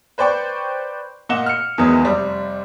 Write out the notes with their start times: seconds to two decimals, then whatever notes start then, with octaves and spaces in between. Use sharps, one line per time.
0.18 B4 C5 D5 G5 C#6
1.29 A#2 D#5 F#5 E7 G7
1.46 F6 C#7
1.78 E2 D#3 F#3 G#3 B3 D#6
2.03 F1 G3